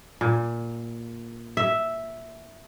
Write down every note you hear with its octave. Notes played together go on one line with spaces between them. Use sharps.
A#2
E5